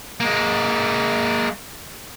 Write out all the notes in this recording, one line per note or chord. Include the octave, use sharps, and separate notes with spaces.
G#3 A#3